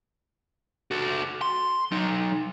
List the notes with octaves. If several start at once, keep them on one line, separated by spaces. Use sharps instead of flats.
F#4 A4
C6
F#3 D#4